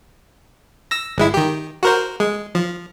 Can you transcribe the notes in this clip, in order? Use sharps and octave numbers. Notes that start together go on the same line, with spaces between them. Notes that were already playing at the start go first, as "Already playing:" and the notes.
E6 A#6
G1 G#3 E4
D#3 G4
F#4 A#4 C5
G#3
F3